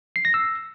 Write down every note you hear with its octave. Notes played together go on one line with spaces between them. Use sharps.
C7
A#6
E6